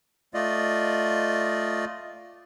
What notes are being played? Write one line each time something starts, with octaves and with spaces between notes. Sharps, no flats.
A3 F4 D5 D#5